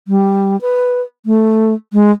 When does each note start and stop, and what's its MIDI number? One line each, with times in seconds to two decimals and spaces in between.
0.08 0.59 55
0.61 1.01 71
1.26 1.73 57
1.93 2.11 56